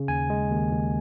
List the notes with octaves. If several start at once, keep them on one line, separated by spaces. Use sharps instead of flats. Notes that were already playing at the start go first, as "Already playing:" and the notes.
Already playing: C#3
D#2 G#5
G#3
D#2
D#2